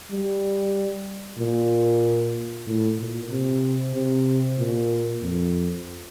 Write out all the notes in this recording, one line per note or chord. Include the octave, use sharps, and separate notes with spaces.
G3
A#2
A2
A#2
C3
C3
A#2
F2